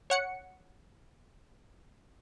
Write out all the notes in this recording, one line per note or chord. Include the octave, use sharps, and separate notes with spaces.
C#5 F#5 C#7